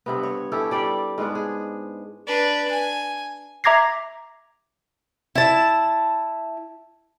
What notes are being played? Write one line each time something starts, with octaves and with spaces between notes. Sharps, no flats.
G2 C3 B3
C#5
C#4 E4 G4 A4
G3 D5 G5
G#2 G#3 B3 D4
G#4
D4 B4
G#5
E5 A#5 D6 G#6 A#6 C7
E4 A5